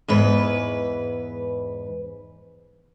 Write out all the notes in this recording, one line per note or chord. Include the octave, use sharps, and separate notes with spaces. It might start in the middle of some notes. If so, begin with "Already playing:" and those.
E2 G#2 B4